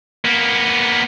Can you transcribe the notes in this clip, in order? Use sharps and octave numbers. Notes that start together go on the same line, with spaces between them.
A#3 B3